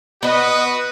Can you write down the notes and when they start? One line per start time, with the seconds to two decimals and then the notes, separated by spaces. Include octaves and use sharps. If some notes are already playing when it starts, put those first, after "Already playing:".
0.23 B3 F#4 B4 D#5